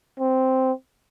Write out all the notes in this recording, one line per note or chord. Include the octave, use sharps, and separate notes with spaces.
C4